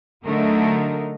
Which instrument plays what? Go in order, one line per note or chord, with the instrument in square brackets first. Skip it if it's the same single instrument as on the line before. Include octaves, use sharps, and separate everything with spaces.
[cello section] D3 F#3 A3 D#4 A#4